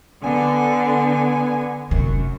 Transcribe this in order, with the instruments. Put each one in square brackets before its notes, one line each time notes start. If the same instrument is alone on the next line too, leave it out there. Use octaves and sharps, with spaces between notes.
[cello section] D3 [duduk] B3 [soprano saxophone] G#5
[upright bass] F1 C#4 [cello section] F#2